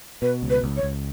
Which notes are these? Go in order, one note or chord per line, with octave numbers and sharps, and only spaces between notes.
B2 B4
C#2
B4
C#2
C#5
C#2